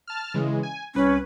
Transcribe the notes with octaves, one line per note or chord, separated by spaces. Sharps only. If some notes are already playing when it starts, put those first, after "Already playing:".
A5 F6
C#3 E3 G#3
G#5
C2 C#4 B4